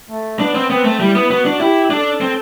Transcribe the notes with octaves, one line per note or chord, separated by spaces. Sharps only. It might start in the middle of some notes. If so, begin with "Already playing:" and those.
A3
B3 D4
C4
B3 C4
A3
G3 E4
B3
B3 F#4
D4
E4 G4
D4 A4
C4